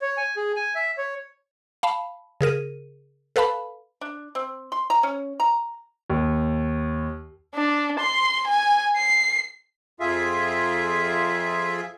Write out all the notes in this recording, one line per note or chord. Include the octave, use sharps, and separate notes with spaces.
C#5
G#5
G#4
G#5
E5
C#5
F5 A5 B5
C#3 G#4 A#4 D#7
A4 B4 F5 A5 B5
D4
C4
C6
A#5
C#4
A#5
D#2
D4
C6
G#5
C7
F2 F4 G#4 E5